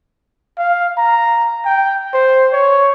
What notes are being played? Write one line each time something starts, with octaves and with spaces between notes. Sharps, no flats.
F5
A#5
G5
C5
C#5